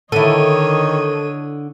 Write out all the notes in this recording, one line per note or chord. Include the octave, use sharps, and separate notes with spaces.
D3 D#3 E4 A4 C#5 D#5 D#7